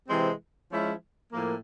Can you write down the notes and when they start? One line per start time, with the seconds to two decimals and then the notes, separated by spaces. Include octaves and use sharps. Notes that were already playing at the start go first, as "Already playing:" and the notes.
0.09 C3 E3 G#3 C4
0.70 F3 G#3 C#4 E4
1.32 A2 F3 A#3